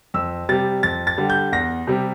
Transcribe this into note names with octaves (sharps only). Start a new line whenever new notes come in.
F2 E6
C3 G3 A6
F2 A6
A6
D3 G3
G6
E2 A#6
C3 G3